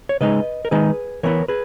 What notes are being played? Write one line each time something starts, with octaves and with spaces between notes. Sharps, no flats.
C#5
C#3 G#3 D#4 B4 D#5
A#4
D#3 G#3 D#4 G#4 B4
E3 B3 E4 A#4 C#5
G#4 B4